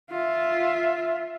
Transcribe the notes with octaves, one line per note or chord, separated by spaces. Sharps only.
F4 E5